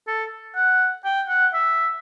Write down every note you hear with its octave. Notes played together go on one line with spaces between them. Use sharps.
A4
F#5
G5
F#5
E5